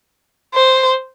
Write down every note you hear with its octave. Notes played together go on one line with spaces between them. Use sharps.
C5